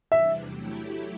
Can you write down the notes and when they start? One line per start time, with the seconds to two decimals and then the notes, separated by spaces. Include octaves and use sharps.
0.11 E2 C3 E3 G3 D4 E5
0.43 F#3 A3 E4 G4